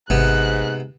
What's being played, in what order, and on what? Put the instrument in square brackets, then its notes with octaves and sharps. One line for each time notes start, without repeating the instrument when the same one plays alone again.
[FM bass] G#1 [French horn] G#2 [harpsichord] C3 B3 [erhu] F#6